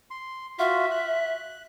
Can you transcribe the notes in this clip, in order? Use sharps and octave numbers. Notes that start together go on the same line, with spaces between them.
C6
F4 F#4 E5
F#6